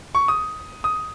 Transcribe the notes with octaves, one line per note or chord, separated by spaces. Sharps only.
C#6
D#6
D#6